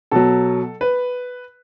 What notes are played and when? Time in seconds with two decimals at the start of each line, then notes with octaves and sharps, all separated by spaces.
0.11 B2 F#3 A4
0.81 B4